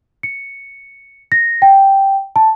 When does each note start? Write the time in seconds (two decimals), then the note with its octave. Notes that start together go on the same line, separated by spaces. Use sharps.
0.23 C#7
1.32 A#6
1.62 G5
2.36 A5